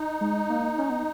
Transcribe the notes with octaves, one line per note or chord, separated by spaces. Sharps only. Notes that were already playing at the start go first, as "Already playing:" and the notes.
Already playing: D#4
G#3
A#3
C#4
B3